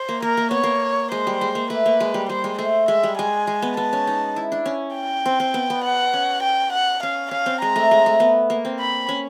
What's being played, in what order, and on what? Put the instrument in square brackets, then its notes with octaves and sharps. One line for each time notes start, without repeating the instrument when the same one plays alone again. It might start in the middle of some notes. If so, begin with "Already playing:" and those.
Already playing: [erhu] C5
[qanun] A#3
[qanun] A#3 [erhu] A#4
[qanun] A#3
[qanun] B3 [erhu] C#5
[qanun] A#3
[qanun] G#3 [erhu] C5
[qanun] G3
G#3
A#3
[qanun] A3 [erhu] B4
[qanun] A#3
G#3
G3
[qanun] G3 [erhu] C5
[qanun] G#3
[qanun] A3 [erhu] C5
[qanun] G#3 [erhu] E5
[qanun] G3
[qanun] G#3 [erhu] G#5
[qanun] G#3
B3
[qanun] B3 [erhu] A5
[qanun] C#4
D#4
E4
D4
C#4
[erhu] G5
[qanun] C4
C4
B3
B3
[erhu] F#5
[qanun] C#4
[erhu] G5
F#5
[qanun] C#4 [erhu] F5
[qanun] C#4 [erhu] F5
[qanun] C4
[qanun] G#3 [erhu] A#5
[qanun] A3
G#3
A3
B3
A#3
C4
[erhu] B5
[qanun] C#4